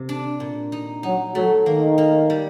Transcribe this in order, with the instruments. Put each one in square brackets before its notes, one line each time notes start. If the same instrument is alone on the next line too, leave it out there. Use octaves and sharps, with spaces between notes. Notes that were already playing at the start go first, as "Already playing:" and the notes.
Already playing: [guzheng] C3
D4
A#2
D#4
[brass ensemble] F#3 [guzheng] D#4
[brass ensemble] F#3 [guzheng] A3
[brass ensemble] D#3 [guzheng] A#3
[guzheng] A#3
G3